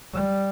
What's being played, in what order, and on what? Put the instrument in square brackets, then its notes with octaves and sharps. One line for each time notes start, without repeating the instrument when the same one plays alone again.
[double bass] G3